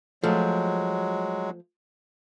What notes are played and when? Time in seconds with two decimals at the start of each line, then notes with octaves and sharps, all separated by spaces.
0.24 F3 F#3 G#3 A3